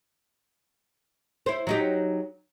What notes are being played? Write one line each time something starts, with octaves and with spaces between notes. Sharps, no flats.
E4 C5
F#3 D#4 G4